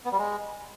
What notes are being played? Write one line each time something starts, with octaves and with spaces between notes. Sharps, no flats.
B3
G3
G#3